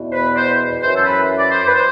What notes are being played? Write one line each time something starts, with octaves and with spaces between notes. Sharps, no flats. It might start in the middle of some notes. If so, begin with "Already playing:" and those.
Already playing: E2 B2
C5
B4
D5
C5
F#2 E3 C5
A4
B4
D5
C5
B4
C5